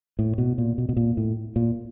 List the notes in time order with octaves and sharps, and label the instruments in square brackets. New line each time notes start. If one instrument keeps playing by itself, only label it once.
[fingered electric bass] A2
B2
A#2
B2
B2
A#2
A2
A#2